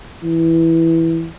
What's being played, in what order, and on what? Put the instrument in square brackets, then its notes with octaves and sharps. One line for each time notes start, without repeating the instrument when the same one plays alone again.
[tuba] E3